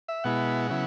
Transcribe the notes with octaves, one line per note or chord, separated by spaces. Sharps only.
E5
B2 G#3 B3 E4 F#5
C#3 F#3 B3 E4